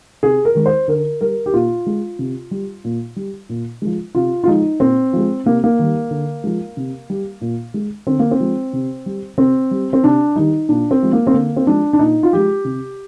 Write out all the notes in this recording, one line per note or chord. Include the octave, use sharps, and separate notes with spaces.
C3 G#4
A#4
D#3 G#3
C5
D3 A#4
G3 A#4
G4
A#2 F4
G#3
C3
G3
A#2
G3
A#2
F3 G#3
C3 F4
F4
F3 G#3 D#4
A#2 C4
F3 G#3
C3 A#3
A#3
D#3 G3
D3
F3 G#3
C3
G3
A#2
G#3
D3 C4
A#3
C4
F3 G#3
C3
G3
C3 C4
G3
C4
C3 D4
D#3 G3 D#4
A#2 D4
C4
F3 G#3
A#3
C4
D3 A#3
C4
F3 G#3 D4
D4
A#2 D#4
F4
F3 G#3 G4
C3